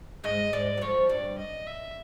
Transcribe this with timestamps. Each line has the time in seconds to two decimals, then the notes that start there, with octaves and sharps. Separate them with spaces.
0.24 G#2 G#3 D#5
0.53 G#2 G#3 D5
0.77 F#3
0.81 F2 F3 C#5
1.09 G2 G3 D5
1.38 D#5
1.67 E5